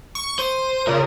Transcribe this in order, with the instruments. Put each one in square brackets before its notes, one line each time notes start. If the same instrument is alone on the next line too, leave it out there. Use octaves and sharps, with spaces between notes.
[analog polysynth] C#6
[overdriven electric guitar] C5 [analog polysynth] D#7
[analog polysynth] A#2 C#3 [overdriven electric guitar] A#4